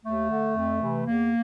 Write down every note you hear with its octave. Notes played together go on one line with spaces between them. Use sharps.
D#2 A3
D3
F2
C3 E3
E2 A#3